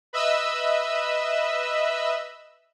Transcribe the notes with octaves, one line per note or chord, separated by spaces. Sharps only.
B4 D#5 E5 B5 E6